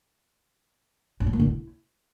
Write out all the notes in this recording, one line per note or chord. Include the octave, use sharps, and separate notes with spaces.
D4
F#3
A#3
D3
E4